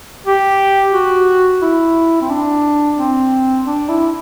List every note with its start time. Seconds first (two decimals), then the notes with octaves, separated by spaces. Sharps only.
0.26 G4
0.93 F#4
1.62 E4
2.22 C4
2.30 D4
2.98 C4
3.65 D4
3.89 E4